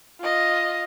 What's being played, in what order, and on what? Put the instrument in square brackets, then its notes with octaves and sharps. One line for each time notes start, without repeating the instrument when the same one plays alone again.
[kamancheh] F4 D#5